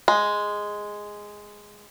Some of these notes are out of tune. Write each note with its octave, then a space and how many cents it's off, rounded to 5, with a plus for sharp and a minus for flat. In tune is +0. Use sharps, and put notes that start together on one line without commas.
G#3 -5